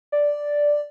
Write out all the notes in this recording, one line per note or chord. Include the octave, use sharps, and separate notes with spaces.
D5